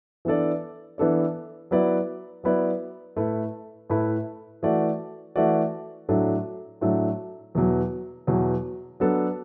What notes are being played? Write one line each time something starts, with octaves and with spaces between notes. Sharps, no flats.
E3 B3 D4 A4 D5
E3 B3 D4 A4 D5
F#3 B3 E4 B4 D5
F#3 B3 E4 B4 D5
A2 A3 E4 B4
A2 A3 E4 B4
E3 A3 F#4 D5
E3 A3 F#4 D5
A2 F#3 A3 D4 A4
A2 F#3 A3 D4 A4
E2 B2 F#3
E2 B2 F#3
F#3 B3 D4 A4